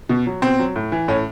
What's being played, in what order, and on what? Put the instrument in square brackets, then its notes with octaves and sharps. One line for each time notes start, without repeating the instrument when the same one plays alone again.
[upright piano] B2
F#3
B2 C4
F#3
A2
E3
A2 C#4